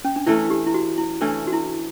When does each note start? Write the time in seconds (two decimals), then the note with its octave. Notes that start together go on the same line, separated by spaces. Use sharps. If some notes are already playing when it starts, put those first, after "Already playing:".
0.05 C#4
0.16 D4
0.26 E3 A3 C#4 E4
0.50 G4
0.67 E4
0.74 F#4
0.98 E4
1.21 E3 A3 C#4 D4
1.47 F#4
1.53 E4